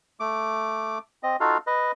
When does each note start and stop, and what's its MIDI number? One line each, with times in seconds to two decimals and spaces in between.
0.20 0.98 57
0.20 0.98 86
1.23 1.36 60
1.23 1.36 75
1.40 1.57 63
1.40 1.57 65
1.40 1.57 66
1.40 1.57 69
1.40 1.57 77
1.67 1.92 71
1.67 1.92 75